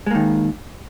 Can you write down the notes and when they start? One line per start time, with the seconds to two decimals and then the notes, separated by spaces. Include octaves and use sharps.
0.06 G#3
0.11 A#3
0.15 D#3